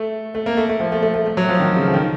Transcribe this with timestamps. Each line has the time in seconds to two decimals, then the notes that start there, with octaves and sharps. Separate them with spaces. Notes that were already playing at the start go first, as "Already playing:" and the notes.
Already playing: A3
0.35 A3
0.46 A#3
0.57 A3
0.69 A3
0.80 F3
0.92 A3
1.03 A3
1.14 A3
1.26 A3
1.37 F#3
1.49 F3
1.60 D#3
1.77 C#3
1.88 F3
1.94 D#3